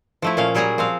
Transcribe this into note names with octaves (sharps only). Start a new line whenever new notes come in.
F3 A3 E4
A#2 C#4 F5
F#3 G3 G#4 G#5 A#5
F3 C4 F5